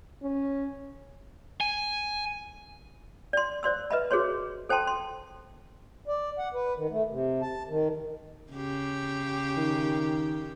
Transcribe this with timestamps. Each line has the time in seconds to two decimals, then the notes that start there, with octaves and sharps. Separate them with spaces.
0.23 C#4
1.61 G#5
3.33 D5 C6
3.63 C5 D5 C6 E6
3.91 B4 D#5 E5 B5
4.11 F#4 G#4 C5 C#5 C6
4.69 A4 C5 G5 A5 C6
4.87 C6
6.08 D5
6.39 F#5
6.54 B4
6.77 D#3
6.91 A3
7.10 C3
7.42 A5
7.69 D#3
8.53 C#3 G4
9.57 D#3